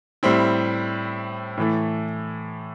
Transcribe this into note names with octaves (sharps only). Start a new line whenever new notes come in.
A2 G3 C4 E4
A2 E3 A3